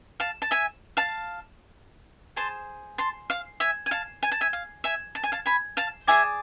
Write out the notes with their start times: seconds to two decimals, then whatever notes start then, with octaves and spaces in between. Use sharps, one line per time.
0.20 F5 A5
0.42 A5
0.51 E5 G#5
0.97 F5 A5
2.36 G#4 C5 A5 C6
2.98 A5 C6
3.30 F5
3.60 E5 G#5
3.86 G#5
3.91 F5 A5
4.23 G#5
4.32 A5
4.41 E5 G#5
4.53 F5
4.84 E5 G#5
5.15 A5
5.23 G#5
5.32 F5 A5
5.46 G#5 B5
5.77 F5 A5
6.07 G#4 D5 E5 G#5